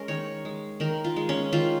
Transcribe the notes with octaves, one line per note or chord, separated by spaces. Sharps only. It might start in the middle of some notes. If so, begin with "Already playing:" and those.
Already playing: G#3 C#4 A#4
D#3 C#5
G#3
D#3 A#4
F4
G#3
C#4
D#3 F4